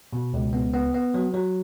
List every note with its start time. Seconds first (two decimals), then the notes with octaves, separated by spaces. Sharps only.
0.13 B2
0.33 C#2
0.53 B3
0.74 B3
0.94 B3
1.14 F#3
1.34 F#3